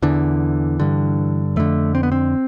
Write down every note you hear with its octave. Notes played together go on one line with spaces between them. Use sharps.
E2 D3 E3
G2 D3
F2 D3 A3
C4
B3
C4